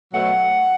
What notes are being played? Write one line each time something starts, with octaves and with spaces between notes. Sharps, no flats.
B2 F#3 A3 F#5